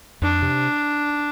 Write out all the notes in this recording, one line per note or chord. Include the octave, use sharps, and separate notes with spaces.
F2 D4
C3